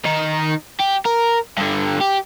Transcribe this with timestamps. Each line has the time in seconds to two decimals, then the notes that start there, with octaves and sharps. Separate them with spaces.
0.05 D#3 D#4
0.80 G4
1.06 A#4
1.57 G2 D3
2.00 G4